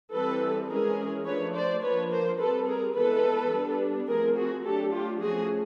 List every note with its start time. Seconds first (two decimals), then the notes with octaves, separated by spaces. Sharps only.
0.13 E3 G3 C4 A4 B4
0.69 E3 G#3 C#4 G#4 A#4
1.26 F3 A3 D4 B4 C#5
1.54 C5 D5
1.82 F3 A#3 D4 B4 C#5
2.10 A#4 C5
2.38 G3 C4 A4 B4
2.67 G#4 A#4
2.94 E3 G#3 B3 A4 B4
3.51 G3 B3 D4
4.07 F3 A3 C4 G#4 A#4
4.35 F#4 G#4
4.63 F#3 A3 D4 G4 A4
4.92 F4 G4
5.20 F3 A3 C#4 F#4 G#4